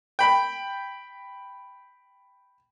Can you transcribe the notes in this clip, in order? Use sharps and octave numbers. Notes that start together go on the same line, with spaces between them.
G5 B5